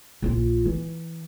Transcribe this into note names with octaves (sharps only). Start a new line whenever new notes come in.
A#1 F4
E3